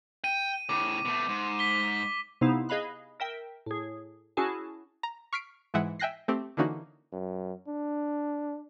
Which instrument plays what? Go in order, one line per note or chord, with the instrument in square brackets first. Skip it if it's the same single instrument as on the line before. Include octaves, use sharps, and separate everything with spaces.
[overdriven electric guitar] G5 [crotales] D#7
[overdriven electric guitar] A2 C#3 [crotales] D6
[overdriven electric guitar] B2 A3
G#2
[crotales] B6 G7
[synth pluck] C3 B3 D#4 E4 F5
G#4 D#5 F5 B5 F#6
A#4 E5 G5
A2 G#4
C#4 E4 F#4 G#4 G#5 A5
A#5
C#6 F6 B6 C7 D7
G#2 E3 G#3 E5 F#5
E5 G5 G#5 F#6 A#6 C7
A3 C4 G4
D3 E3 A#3 C#4 D#4 F#4
[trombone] F#2
D4